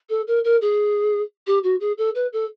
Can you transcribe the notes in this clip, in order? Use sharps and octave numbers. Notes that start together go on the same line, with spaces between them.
A4
A#4
A#4
G#4
G4
F#4
G#4
A4
B4
A4